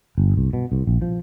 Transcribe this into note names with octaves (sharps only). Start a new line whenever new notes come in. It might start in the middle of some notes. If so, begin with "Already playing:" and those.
G1
C2
B2
C2
A#1
F3